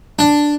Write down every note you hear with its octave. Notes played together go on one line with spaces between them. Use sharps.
D4